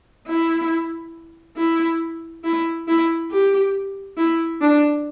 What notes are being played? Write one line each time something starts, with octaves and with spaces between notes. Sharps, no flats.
E4
E4
E4
E4
G4
E4
D4